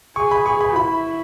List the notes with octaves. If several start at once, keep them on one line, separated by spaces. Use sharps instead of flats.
G#4 C#6
B5
G#4 C#6
B5
E4 B5